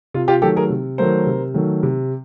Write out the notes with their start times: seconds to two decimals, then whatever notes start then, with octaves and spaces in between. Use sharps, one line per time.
0.14 C3 F4
0.28 F4 G4
0.42 D#3 F#3 A3 G4 A4
0.56 G#4 A#4
0.70 C3
0.98 D#3 F#3 A3 A#4 C5
1.26 C3
1.54 D#3 F#3 A3
1.83 C3